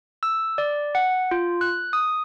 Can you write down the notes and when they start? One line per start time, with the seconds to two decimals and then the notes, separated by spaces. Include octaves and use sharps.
0.23 E6
0.58 D5
0.95 F#5
1.31 F4
1.61 F#6
1.93 D#6